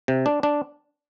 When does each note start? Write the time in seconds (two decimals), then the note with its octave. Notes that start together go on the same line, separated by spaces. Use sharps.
0.08 C3
0.26 D4
0.43 D4